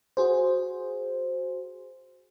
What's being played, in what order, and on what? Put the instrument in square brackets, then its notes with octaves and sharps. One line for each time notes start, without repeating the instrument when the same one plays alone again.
[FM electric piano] F#4 G#4 C5